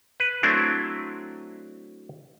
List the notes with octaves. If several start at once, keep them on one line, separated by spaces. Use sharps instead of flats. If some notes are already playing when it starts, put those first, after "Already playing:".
B4
F#3 A3 C4 D4 E4